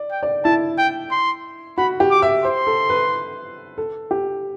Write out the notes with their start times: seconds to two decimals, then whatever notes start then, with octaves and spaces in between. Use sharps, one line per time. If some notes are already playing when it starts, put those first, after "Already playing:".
Already playing: D5
0.12 G5
0.23 D5
0.45 E4 A5
0.78 G5
1.12 C6
1.78 F#4 B5
2.00 G4
2.11 D6
2.22 E5
2.44 C5 C6
2.67 A4
2.89 B4
3.78 A4
4.11 G4